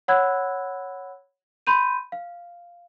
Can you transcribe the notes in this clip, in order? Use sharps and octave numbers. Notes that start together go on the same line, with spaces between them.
C#5 F#5 B5 E6 F#6 G#6
B5 C6 G6 D#7
F5